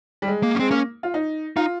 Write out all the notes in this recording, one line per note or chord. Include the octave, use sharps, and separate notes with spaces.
G3
G#3
A#3
C#4
G#3 C4
A#3 C#4
F4
D#4
D#4 F4